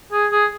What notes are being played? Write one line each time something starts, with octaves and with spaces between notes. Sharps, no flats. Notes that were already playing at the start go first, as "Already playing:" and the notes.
G#4
G#4